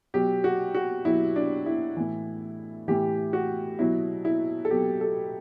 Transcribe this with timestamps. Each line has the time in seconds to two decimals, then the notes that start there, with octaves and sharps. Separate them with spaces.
0.14 B2 F#3 G4
0.44 F#4
0.74 F#4
1.05 B2 F#3 E4
1.36 D4
1.66 E4
1.97 A2 E3
2.88 A2 E3 G4
3.33 F#4
3.79 B2 F#3 E4
4.25 E4
4.65 A4
4.71 B2 F#3 G4
5.01 A4